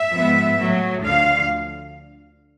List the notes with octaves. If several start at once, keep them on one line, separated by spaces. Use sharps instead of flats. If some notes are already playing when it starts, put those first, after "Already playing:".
Already playing: E5
G#2 F3 G#3 B3
A2 F#3 A3
D2 D3 F3 F5